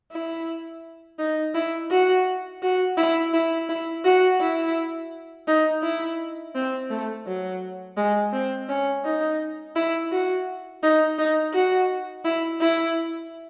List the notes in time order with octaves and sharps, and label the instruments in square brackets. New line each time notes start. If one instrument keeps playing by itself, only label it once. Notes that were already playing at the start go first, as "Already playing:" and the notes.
[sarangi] E4
D#4
E4
F#4
F#4
E4
E4
E4
F#4
E4
D#4
E4
C4
A3
F#3
G#3
C4
C#4
D#4
E4
F#4
D#4
D#4
F#4
E4
E4